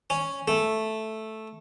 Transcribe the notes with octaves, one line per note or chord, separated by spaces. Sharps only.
C#4
A3